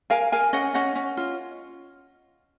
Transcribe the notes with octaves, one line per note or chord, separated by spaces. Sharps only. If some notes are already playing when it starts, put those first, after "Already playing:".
A#4 F5 G#5
A#4 F5 G#5
C#4 D#5 F#5
C#4 D#5 F#5
C#4
F4